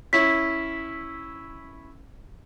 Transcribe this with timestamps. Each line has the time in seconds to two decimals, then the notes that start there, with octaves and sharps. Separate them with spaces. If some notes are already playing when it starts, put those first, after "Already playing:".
0.13 C#4 E4 B6